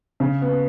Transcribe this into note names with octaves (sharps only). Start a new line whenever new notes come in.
C#3
B3